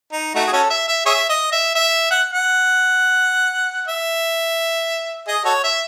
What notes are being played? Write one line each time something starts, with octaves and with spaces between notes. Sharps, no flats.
D#4
A3 D#4 F#4
G#4
C#4 F#4 A4
E5
E5
G#4 C#5 E5
D#5
E5
E5
F#5
F#5
E5
G#4 D#5
F#4 A4 C#5
E5